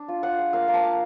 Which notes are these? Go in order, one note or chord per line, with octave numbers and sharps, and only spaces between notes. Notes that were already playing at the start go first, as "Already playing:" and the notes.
Already playing: D4
F4
F4 F#5
G#3
A#3 F5
A#3
A5
A#3